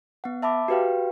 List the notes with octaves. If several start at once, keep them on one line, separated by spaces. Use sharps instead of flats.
B3 F#5
E5 A5 B5 D6
F#4 G4 B4 F5 G5